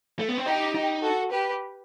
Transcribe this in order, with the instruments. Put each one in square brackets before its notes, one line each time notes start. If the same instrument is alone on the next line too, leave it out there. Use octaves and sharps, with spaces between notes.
[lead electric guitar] A3
B3
C4
[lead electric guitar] D#4 [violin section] G4
[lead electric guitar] D#4
[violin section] F#4 A4
G4 B4